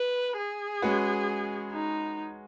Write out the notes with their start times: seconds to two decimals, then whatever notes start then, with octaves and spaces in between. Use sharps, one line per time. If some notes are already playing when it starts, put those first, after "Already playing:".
Already playing: B4
0.37 G#4
0.82 G#3 C#4 F#4 B4
1.73 D#4